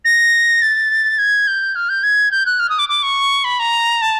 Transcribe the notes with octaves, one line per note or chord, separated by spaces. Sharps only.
A#6
A6
G#6
G6
F6
G6
G#6
G6
F#6
F6
D#6
D6
D6
C#6
B5
A#5
A5